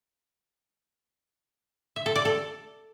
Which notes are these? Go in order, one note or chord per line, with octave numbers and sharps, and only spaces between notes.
E5
A4
D5
A4